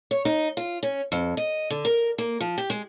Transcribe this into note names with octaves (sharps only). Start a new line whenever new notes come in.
C#5
D#4
F4
C#4
F2
D#5
D3
A#4
A#3
F3
G4
G#3